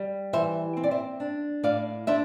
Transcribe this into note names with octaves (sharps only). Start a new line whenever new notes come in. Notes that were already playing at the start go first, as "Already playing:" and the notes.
Already playing: G3
E3 C5 E5
C4
D5
C5 E5
D4
A2 D5 F5
D4 C5 E5